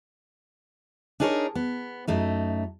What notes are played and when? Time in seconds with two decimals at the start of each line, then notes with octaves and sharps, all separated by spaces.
1.20 D4 D#4 G#4 A#4 C5 C#5
1.55 B3
2.07 F#2 A3 D#4